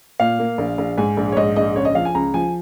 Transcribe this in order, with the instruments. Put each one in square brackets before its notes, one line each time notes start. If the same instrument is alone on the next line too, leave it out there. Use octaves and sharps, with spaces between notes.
[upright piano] A#2 F5
A#3
A#1
A#1
G#2 G#5
A#1
C#5
G#2 D#5
A#1 D#5
C#2 C#5
D#5
F3 F5
G#5
C#2 A#5
F3 G#5